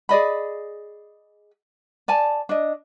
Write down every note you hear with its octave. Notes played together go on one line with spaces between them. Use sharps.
G#4 D5 D#5 B5
D5 G#5 A5
D4 D#5